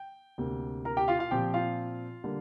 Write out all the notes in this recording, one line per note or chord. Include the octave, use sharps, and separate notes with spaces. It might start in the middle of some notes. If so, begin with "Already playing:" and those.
Already playing: G5
D2 C3 A#3
A#4 A#5
G4 G5
F4 F5
F4 F5
A#2 F3 C4 G4 G5
F4 F5
D3 G3 A#3